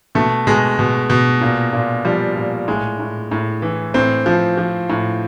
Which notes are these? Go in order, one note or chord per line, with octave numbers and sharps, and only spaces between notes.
B2 A3
B2 G#3
B2
B2
A#2
A#2
F3 G3
A#2
A2 G#3
A2
A2
E3
A2 C4
F3
F3
A2